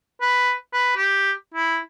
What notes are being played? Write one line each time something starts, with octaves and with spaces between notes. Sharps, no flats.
B4
B4
G4
E4